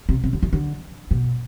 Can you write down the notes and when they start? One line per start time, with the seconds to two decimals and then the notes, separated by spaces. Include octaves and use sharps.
0.09 C3
0.24 C3
0.33 D3
0.43 E3
0.53 D3
1.11 B2